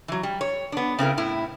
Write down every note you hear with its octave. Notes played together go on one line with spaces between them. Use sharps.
E3 F#3
G3
C#5
B3 D4
C#3 C4 E4 A#4
A2 E4